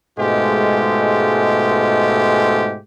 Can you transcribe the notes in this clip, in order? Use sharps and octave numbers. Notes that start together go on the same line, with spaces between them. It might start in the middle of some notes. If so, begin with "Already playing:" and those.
G#2 B2 G#3 A3 F4 G4